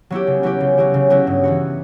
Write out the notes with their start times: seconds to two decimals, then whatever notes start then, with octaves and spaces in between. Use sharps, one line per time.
0.10 F#3 B3 E4 G4
0.27 C#3
0.43 F#3 B3 E4 G4
0.60 C#3
0.77 F#3 B3 E4 G4
0.94 C#3
1.10 F#3 B3 E4 G4
1.27 G2
1.43 E3 B3 F#4